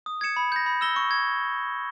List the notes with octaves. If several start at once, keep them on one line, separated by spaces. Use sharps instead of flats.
D#6
G#6 C#7 E7
B5
G6 A#6
B5
E6 A#6 E7 G7
C#6
G#6